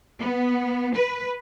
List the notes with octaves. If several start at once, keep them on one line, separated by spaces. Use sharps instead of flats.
B3
B4